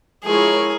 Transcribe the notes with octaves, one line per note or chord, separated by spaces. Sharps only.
F3 G#3 E4 G#4 A#4 C#5